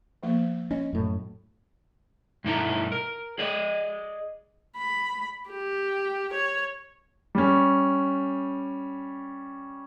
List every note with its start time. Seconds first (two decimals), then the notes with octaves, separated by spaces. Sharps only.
0.23 F3 A#3 B3
0.71 C#4 D#5
0.93 F#2 A2
2.44 G2 B2 D#4 E4 A4 A#5
2.92 A#4
3.38 G#4 D5 D#5
4.77 B5
5.50 G4
6.33 C#5
7.35 G3 C#4